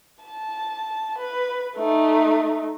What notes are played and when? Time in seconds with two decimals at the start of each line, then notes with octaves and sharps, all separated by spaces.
0.24 A5
1.18 B4
1.76 A3 D#4